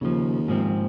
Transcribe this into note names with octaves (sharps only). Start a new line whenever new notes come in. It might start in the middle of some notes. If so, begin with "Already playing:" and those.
D#2 C#3 F3
G#2 F3 C4